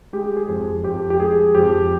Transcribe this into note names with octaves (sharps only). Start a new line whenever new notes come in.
G#3 G4
G#4
F2
F2 G4
G4
G#3 G#4
F2 G4